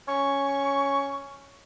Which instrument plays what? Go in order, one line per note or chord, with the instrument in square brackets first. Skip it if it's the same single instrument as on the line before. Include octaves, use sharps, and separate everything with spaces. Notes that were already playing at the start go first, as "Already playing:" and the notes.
[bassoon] C#4 [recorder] C#6